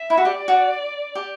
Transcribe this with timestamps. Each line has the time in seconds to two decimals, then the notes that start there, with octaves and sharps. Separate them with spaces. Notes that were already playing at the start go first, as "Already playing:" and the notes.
Already playing: E5
0.10 E4
0.17 F#4
0.25 G4 D5
0.48 F#4
1.15 G4